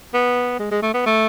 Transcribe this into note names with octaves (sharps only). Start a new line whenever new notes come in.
B3
G#3
G#3
A3
B3
A3